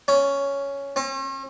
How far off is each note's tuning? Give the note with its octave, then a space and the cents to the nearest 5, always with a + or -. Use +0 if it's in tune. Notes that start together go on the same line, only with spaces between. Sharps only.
C#4 +5
C#4 -45